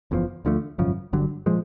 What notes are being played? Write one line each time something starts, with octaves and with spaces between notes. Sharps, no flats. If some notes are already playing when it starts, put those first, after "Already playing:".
F#1 E2 C3 F3
D2 D3 F3 A3
G#1 F#2 C#3 F3
G1 G2 D3 F#3
A#2 F3 G#3